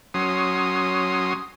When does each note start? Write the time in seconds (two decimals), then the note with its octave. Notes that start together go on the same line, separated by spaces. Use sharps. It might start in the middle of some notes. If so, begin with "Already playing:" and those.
0.14 F#3 C#4 C6 D#6